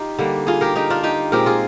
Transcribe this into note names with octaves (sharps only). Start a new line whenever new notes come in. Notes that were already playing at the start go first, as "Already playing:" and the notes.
Already playing: D#4 F4 G4
D3 G3 A#3
F4 G#4
G4 A#4
D#4 G4
D4 F4
D#4 G4
A#2 G#3 C4 G4 A#4
F4 G#4